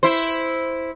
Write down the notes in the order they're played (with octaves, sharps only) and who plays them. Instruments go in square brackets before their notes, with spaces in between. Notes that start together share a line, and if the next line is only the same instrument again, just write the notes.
[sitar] E4 C5